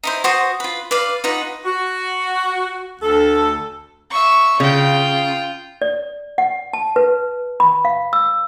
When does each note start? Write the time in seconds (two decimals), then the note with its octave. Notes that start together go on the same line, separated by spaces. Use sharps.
0.03 D#4 E4 C5
0.24 F#4 C5 D#6
0.60 F4 B4
0.91 B4 D5 F5
1.24 D#4 F4 B4 F#5
1.65 F#4
3.02 D2 A4
4.10 E5 C#6
4.60 C#3 F4 G5
5.82 D5
6.38 F#5
6.73 A5
6.96 B4
7.60 B5
7.85 F5
8.13 E6